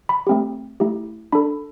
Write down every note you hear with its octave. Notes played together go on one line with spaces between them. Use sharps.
B5
A3 C4 G4
A3 E4 G4
D4 A4 B5